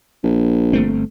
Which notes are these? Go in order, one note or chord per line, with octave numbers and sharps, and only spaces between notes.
A#1
G1 A3 C4